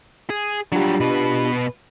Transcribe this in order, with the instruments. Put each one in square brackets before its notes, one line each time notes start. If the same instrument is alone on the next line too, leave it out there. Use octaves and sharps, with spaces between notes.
[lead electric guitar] G#4
[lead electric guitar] F#3 G3 [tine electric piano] D4 F4 G4
[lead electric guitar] B2 B4